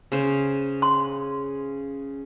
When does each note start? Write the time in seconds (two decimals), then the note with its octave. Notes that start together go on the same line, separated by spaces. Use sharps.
0.12 C#3 C5
0.82 C6